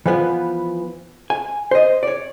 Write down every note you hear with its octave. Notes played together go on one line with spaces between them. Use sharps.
E3 F3 B3
G#5
C5 D#5
C#5 D5